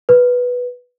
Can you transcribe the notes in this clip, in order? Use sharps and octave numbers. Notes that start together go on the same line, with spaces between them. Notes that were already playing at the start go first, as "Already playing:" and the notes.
B4